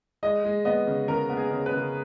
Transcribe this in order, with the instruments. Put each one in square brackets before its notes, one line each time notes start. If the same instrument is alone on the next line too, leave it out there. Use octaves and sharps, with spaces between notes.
[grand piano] G#3 D#5
G#3
B3 D#5
C#3
C#3 A#4
B3
G#4
C#3
B4
C#3